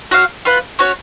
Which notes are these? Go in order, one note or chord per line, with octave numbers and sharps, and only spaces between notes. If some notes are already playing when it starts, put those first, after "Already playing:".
F#4 C#5 F5
F4 B4 F#5
C#4 F#4 C#5